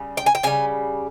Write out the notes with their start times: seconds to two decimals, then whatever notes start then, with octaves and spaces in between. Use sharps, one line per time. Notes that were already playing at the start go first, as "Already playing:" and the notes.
Already playing: C#3 G3
0.17 G5
0.26 G#5
0.35 G5
0.43 C#3 G3 G#5